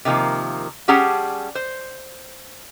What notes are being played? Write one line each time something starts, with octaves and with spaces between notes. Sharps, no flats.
C3 D#3 F3 A#3
G3 C#4 G4 G#4 F#5 A5
C5